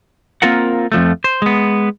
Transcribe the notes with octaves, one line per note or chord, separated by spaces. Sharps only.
A#3 C4 F4 A#4 F#5
F2 F3 A3
C5
G#3 B3